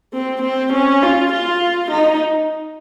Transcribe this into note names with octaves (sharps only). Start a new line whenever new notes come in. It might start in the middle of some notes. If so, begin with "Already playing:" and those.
C4
C4
C#4
F4
F4
D#4